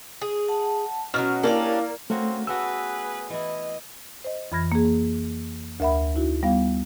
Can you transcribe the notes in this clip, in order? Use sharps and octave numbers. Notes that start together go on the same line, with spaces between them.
G#4
F#5 A5
B2 F3 F#3 C#4 F#4 F6
G3 A#3 C#4 D4 E4 A#4 D5 F5
A3 A#3 C4 C#4 F#4
A3 B3 F#4 G#4 B4 E6
E3 E4 D#5
C5 D#5
F2 E3 B5 F6 G#6 A#6
A#3 G#4
D2 A#4 E5 F#5 B5
D#4 E4 F#4
G3 B3 F5